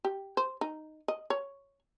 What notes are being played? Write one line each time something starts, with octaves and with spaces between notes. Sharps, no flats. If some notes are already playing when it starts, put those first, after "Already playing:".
G4
C5
D#4
D#5
C#5